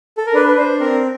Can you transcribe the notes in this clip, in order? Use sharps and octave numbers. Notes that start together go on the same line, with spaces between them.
A4
A#4
D4 B4
B4
D4 C5
C4 A#4